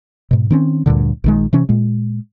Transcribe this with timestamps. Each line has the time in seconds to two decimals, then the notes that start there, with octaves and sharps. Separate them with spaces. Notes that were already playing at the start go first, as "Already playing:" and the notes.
0.31 G#2 B2
0.50 D#3 C4 C#4
0.86 D2 G2 A#2 D3
1.24 A#1 D#3 G#3
1.53 C3 E3 C#4
1.69 A#2 G#3